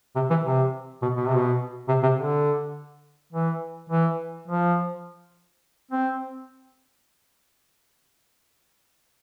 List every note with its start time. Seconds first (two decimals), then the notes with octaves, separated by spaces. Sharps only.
0.15 C3
0.30 E3
0.45 C3
1.02 B2
1.16 B2
1.26 C3
1.36 B2
1.88 C3
2.03 C3
2.16 D3
3.33 E3
3.90 E3
4.48 F3
5.91 C4